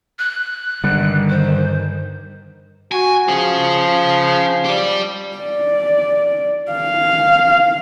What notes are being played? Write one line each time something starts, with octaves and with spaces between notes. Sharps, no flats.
F#6
G2 D3 D#3 G3
C5
F#4 G#5
F3 C#4 G#4
G4 D5
D5
F5